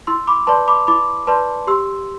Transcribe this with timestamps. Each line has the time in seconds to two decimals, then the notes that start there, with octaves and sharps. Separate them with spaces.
0.07 E4 C6 E6
0.27 B5 D6
0.47 B4 D5 A5 C6
0.68 B5 D6
0.87 E4 B5 D6
1.27 B4 D5 A5 C6
1.67 G4 C6 E6